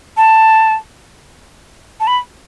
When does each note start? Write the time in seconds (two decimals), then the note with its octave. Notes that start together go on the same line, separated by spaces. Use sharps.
0.17 A5
2.00 A5
2.07 B5